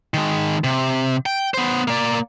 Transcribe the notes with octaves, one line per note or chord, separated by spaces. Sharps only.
D#3 G#3
C3
G5
B3 C5
A#3 D5